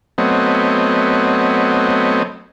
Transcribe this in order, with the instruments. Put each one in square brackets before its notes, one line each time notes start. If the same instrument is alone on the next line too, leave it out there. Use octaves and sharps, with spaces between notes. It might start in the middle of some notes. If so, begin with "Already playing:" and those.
[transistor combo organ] F#3 A3 B3 C4 C#5 D#5